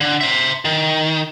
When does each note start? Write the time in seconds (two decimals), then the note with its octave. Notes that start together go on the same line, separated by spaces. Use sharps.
0.01 D3
0.21 C5 E5
0.65 D#3